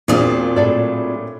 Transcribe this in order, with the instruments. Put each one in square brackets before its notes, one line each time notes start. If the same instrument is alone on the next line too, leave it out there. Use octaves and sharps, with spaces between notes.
[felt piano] E2 [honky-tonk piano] A#2 D4 D#6 [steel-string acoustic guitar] F#3 C4 F4
[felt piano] A2 [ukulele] G#4 A4 D5